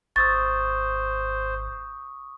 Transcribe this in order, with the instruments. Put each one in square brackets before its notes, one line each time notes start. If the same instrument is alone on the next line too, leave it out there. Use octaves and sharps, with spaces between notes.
[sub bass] G#1 [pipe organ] C5 [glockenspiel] C#6 D#6 E6 [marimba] A6